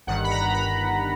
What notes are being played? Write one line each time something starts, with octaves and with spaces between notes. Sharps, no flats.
G1 G2 D#3 F#5
B5
A#5
B5